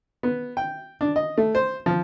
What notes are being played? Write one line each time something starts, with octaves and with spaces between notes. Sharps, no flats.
B3
G5
D4
D#5
A3
C5
F3